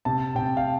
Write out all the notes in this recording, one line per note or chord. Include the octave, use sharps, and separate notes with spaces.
C3 A5
C3 G5
F5